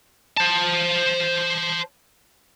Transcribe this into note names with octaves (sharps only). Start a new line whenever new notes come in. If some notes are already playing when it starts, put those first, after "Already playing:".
C5 A5